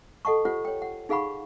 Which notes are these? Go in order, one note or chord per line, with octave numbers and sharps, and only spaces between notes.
A4 D#5 F#5 A5 C#6
F4 G4 C5 F#5
C#5 G5
F#5
D#4 G#4 F5 F#5 B5 C#6